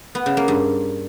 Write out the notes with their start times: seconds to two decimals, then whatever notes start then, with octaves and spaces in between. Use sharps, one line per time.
0.15 B3
0.26 C#3
0.37 A#3
0.48 G2